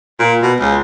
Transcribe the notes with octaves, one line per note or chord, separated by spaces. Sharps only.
A#2
B2
C#2